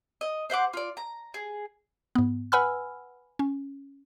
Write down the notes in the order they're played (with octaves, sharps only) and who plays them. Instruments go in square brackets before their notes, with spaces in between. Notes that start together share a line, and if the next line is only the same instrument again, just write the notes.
[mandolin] D#5
C5 E5 F#5 D6
F4 D5
A#5
G#4
[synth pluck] G#2 B3
B4 F#5 G#5 B5 E6 F6
C#4